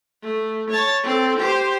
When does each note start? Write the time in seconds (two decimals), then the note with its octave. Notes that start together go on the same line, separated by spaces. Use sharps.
0.23 A3
0.70 C#5 A5
1.03 C4 A4
1.38 G4 C5